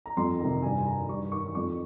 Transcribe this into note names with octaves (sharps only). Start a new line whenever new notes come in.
A#5
F2 C6
C3 D#3 A#5
G2 G#5
G#5
D#3 A#5
G2 C#6
D#3 C#6
F2 C#6